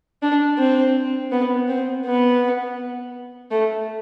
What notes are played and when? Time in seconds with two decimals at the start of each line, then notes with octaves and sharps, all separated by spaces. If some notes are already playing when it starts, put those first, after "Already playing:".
0.23 D4
0.59 C4
1.32 B3
1.68 C4
2.05 B3
3.51 A3